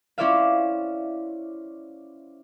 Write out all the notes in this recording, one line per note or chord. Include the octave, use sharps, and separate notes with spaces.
C#4 E4 C5 D5 E5 F5